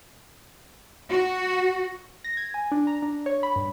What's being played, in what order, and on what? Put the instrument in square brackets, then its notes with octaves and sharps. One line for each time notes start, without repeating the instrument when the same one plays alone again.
[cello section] F#4
[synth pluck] A#6
G#6
G#5
D4
A#5
D4
C#5
B5
G2